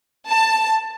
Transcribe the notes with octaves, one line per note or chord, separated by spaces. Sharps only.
A5